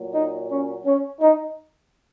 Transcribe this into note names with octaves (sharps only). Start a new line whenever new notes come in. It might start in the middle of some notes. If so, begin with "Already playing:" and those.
Already playing: A#2 F#3
D#4
C#4
C#4
D#4